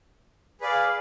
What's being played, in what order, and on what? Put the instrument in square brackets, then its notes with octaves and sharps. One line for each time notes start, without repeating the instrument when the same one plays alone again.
[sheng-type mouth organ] G#4 B4 D5 F5